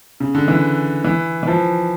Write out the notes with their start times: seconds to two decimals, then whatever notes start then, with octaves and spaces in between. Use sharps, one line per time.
0.20 C#3
0.35 D3
0.48 E3
1.04 E3
1.43 E3
1.47 F3